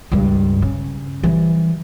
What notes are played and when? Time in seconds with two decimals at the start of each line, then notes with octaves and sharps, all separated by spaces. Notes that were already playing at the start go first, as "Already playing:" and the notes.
0.12 C#2 G2
0.62 C#3
1.24 E3 G3